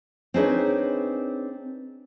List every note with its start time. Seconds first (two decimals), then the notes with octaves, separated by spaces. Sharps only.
0.34 C4 D4 D#4 G#4 B4 C#5